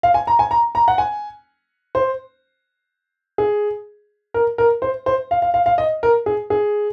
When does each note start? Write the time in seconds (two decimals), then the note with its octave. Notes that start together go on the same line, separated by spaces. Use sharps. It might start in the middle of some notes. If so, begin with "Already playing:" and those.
0.03 F5
0.14 G#5
0.27 A#5
0.39 G#5
0.51 A#5
0.75 A#5
0.88 F#5
0.98 G#5
1.95 C5
3.38 G#4
4.34 A#4
4.58 A#4
4.82 C5
5.06 C5
5.31 F5
5.42 F5
5.54 F5
5.66 F5
5.78 D#5
6.03 A#4
6.26 G#4
6.50 G#4